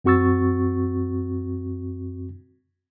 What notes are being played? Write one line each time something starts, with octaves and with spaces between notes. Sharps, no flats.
F#2 C4 F#4 C#6 E6 A6